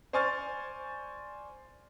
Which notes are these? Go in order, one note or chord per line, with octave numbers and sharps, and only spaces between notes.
C5 D5 G#5 C#6 F6 A6